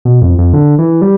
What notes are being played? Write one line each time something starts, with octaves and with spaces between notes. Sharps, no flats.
B2
F2
F2
D3
E3
G3